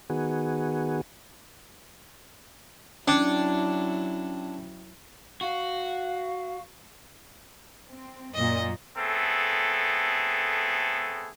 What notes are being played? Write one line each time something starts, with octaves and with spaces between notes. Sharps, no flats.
D#3 B3 F#4 G#4
F#3 C#4 D4 E4 G5
F#4 F5
C4
F#2 A#2 D#5
A3 B3 C4 G#4 A4